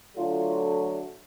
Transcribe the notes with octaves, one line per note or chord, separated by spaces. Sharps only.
D3 F#3 A3 F4